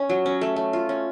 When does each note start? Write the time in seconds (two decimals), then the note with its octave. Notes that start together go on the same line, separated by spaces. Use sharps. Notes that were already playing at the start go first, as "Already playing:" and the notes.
Already playing: C#4
0.09 F#3
0.26 C#4
0.41 A3
0.56 A3
0.73 F4
0.89 C#4